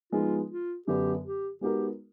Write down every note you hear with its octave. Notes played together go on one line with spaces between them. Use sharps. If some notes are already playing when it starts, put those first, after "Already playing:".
F3 G#3 B3 D#4 F4 G#4
F4
F#2 D3 F#3 B3 D4 G4
G4
G#3 B3 D#4 F#4 G4 A#4